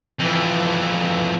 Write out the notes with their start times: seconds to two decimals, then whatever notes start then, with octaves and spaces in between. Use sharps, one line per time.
0.19 F2 E3